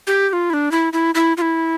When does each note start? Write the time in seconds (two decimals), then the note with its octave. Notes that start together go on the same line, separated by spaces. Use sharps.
0.07 G4
0.29 G4
0.33 F4
0.50 E4
0.53 D4
0.71 E4
0.93 E4
1.15 E4
1.37 F4
1.42 E4